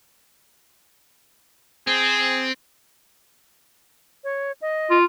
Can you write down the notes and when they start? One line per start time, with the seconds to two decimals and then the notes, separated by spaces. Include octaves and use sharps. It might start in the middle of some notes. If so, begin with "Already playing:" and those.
1.87 C4 G#4
4.24 C#5
4.62 D#5
4.90 F4